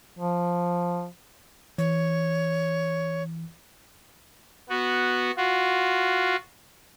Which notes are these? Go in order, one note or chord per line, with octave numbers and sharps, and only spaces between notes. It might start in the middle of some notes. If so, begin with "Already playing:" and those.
F3
E3 C#5
B3 F#4
F4 F#4